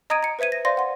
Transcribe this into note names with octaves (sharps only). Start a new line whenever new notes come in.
D#5 A#5 D#6 G#6 D7 D#7
A#5 C#7
B4 C5 E5 G#6 D#7
A#6
C5 D5 F5 C6 A#6
F#5 C6